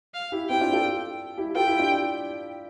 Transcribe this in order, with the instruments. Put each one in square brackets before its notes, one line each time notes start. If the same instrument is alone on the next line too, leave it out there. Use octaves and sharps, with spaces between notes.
[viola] F5
[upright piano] E4 G4
[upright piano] C4 E4 [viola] G5
[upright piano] D4 F4
F4 A4
E4 G4
[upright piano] F4 A4 [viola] G5
[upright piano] E4 G4
D4 F4